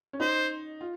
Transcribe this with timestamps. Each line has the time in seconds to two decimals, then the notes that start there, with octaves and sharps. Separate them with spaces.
0.13 C#4
0.20 D#4 C5
0.81 F4